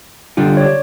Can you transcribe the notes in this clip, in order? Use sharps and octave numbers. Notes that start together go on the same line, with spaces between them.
D3 G3 F4
C#5 D5